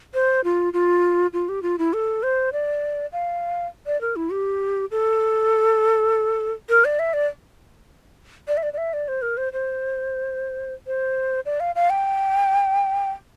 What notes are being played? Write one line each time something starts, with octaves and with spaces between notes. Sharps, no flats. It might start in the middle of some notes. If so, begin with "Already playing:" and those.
C5
F4
F4
F4
G4
F4
E4
A4
C5
D5
F5
D5
A#4
E4
G4
A4
A#4
D5
E5
D5
D5
E5
D5
D5
E5
D5
C5
A#4
C5
C5
C5
D5
F5
F5
G5